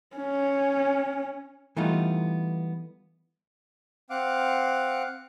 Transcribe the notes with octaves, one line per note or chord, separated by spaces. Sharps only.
C#4
E3 G3 A3 B3 D#4 F4
C4 F5 F#5 D6